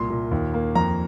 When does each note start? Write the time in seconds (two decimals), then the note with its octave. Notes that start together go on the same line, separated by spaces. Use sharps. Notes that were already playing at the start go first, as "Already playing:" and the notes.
Already playing: C2 A#2 C6
0.10 A#2
0.31 D#2
0.54 A#3
0.75 F2 A#5